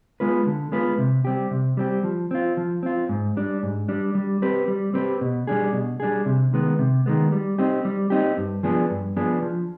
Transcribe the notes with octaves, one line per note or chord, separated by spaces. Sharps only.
G#3 B3 F4 B4
D3
G#3 B3 F4 B4
C3
G3 C4 G4
C3
G3 C4 G4
F3
C4 F4
F3
C4 F4
G#2
G3 D4
G#2
G3 D4
G3
C4 G4 B4
G3
C4 G4 B4
B2
G3 D4 G#4
B2
G3 D4 G#4
C3
D#3 G#3 B3
C3
D#3 G#3 B3
G3
C4 D#4 G4
G3
C4 D#4 G4
G2
F3 B3 D4 G#4
G2
F3 B3 D4 G#4
F3